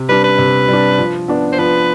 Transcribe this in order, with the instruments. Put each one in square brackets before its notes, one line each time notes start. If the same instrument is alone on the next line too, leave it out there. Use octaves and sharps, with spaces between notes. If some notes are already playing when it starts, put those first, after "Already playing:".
Already playing: [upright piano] C3
[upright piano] G3 D4 [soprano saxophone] B4
[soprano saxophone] B4
[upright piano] C3
G3 D4
F3
B3 D4
[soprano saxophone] C5
[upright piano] F3 [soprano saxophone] B4